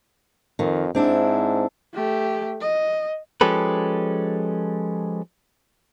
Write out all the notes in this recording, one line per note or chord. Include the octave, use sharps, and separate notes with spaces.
F2 D#3
G#2 C4 D4 E4
A3 G4
D#5
F3 G#3 C#4 G4 A4 B4